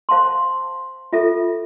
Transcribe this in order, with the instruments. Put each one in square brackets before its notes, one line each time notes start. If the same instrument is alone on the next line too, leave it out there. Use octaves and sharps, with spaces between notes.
[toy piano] C5 F5 A5 C6
F4 A4 E5